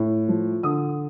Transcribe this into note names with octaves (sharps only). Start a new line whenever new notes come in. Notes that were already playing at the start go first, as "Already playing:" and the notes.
Already playing: A2
F3
D3 D#6